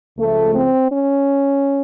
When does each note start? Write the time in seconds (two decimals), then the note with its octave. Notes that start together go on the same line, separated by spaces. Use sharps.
0.17 C#2 C#3 F3 A3
0.55 C4
0.92 C#4